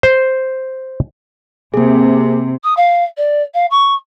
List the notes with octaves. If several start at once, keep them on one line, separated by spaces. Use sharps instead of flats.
C5
C3 A#3 G#4
D#6
F5
D5
F5
C#6